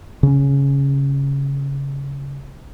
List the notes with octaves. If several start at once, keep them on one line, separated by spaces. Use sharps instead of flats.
C#3 C#4